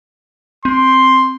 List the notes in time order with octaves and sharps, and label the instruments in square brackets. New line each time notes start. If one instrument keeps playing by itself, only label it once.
[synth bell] C4 [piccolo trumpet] C6